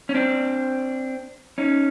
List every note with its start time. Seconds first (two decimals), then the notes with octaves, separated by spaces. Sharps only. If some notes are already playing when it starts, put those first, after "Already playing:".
0.09 C#4
0.14 C4 D4
1.58 C#4 D#4